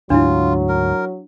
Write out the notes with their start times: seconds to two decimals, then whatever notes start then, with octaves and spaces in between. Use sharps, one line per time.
0.10 D2 G#2 F#3 D4 E4 F4
0.69 A#4